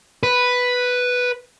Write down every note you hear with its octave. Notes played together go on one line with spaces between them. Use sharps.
B4